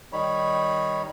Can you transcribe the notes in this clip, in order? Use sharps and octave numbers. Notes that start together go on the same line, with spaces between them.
D#3 G3 D#4 C#5 B5